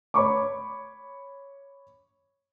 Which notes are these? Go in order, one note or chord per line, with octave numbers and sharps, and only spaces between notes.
C#5 B5 C#6 D6